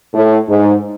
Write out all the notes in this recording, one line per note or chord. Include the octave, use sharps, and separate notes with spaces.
A2
G#2